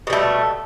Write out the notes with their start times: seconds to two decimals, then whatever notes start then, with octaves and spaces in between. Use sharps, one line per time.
0.07 B2
0.10 G3
0.13 A3